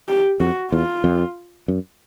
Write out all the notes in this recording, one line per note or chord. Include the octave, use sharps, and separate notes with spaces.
G4
F2 F#4
E2 F4
F2
F#2